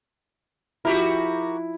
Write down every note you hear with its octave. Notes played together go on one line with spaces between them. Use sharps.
F3 E4 F#4 G4 A#4